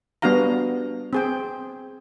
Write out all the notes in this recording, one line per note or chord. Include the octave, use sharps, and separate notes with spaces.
G3 B3 D4 F#4 F5 A#5
C4 G#4 G5